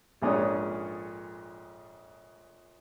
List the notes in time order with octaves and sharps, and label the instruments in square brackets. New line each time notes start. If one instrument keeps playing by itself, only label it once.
[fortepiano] A#1 F2 G#2 C#4 D4 D#6